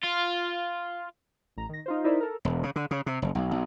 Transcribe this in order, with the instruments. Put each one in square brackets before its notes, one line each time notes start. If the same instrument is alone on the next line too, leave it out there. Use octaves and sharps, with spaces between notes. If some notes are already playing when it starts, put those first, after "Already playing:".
[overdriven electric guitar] F4
[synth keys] A1 A#5
D#3 A#6
D#4 F4 C5
D#4 E4 A#4 C5 D5 E5
A4 A#4
[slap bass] E1
C#3
D3
C#3
C3
F#1
B1
B1